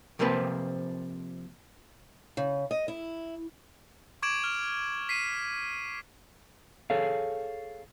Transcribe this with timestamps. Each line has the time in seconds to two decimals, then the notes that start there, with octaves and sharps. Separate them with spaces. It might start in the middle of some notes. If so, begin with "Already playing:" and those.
0.19 C3 F3 A#3 C4 B4
2.37 C#3
2.71 D#5
2.88 E4
4.22 C#6 D6 G#6 D7 E7 F#7
4.44 F6
5.09 B6 C7 D#7
6.90 G#4 A4 C#5 F5